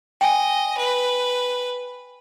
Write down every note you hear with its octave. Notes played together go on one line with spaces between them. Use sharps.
D#5 G5 G#5
B4